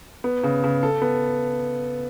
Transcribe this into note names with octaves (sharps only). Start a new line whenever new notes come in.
B3
C#3
C#3
A4
B3